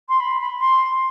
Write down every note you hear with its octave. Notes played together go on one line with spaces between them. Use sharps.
C6
B5
B5
C6